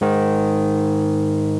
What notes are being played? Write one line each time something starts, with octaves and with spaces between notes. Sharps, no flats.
G#2 D#3